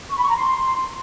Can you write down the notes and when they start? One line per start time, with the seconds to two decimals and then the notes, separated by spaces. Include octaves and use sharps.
0.10 C#6
0.16 B5
0.23 C#6
0.29 A#5
0.35 C6